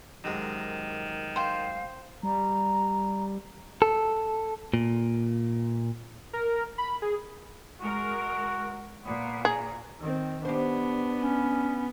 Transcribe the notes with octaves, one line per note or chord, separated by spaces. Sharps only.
F#2 C3 D#3 G#3
C5 F5 G5
G3 A#5
A4
A#2
A#4
B5
G#4
G#3 F#4 A#4
A#2 B3
G#4 A#5
D#3 C4
B3 D4 G4 C5
C#4